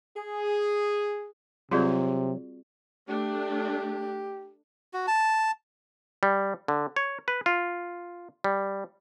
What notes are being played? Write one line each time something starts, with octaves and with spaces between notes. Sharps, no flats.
G#4
C3 F#3 G3 C4 F4 F#4 G#4 D5
A3 D4 G4
F#4
A5
G3
D3
C#5
B4
F4
G3